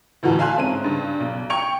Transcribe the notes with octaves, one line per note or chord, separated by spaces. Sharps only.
D2 A2 E3 F#4 A5
E5 F5 G#5 A5 C6 F#6
G#2 C4 C#4 D#7
G2 C#3
B1
G5 C#6 G#6 C#7 F7